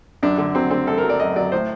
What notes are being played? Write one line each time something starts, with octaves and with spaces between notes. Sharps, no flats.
F#2 D4
D3
F#3 C4
D3 C4
F#2 A4
A#4
F#3
D5
F#2 D#5
F#3 D5
A2 C5